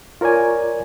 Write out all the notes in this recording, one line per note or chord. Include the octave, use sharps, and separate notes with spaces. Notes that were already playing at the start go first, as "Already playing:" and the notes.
F4 A#4 C#5 D5 G#5